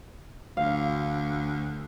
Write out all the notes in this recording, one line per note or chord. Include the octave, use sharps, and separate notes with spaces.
D2 F5